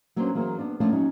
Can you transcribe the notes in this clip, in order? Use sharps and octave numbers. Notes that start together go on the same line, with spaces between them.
F#3 A#3 C#4 D4 B4 C5
E3 F#3 A#3 G#4 A#4 C5
B3 D4
F3 A3 A#3 C#4 D4
F#3 C#4 D#4 F#4